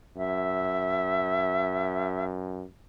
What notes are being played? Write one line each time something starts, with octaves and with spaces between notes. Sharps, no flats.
F#2 E5